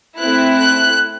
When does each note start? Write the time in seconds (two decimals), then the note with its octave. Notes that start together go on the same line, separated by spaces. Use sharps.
0.19 A3 C4 E4 F#6
0.56 F#6